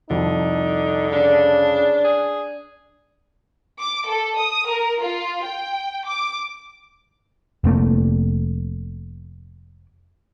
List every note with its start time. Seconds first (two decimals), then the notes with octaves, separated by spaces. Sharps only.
0.10 C2 F2 D3 D#4
1.12 C#3 D4
2.04 G#4
3.79 D6
4.08 A4
4.38 D#6
4.70 A#4
5.01 F4
5.45 G5
6.07 D6
7.64 F1 C3 A3 A#3